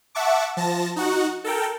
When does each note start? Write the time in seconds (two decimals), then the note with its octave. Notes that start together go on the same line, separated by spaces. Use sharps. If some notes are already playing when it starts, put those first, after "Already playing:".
0.15 E5 F#5 A5 C#6 D6
0.57 F3 A5 A#6
0.96 D#4 F#4 F#5
1.44 A4 A#4 G5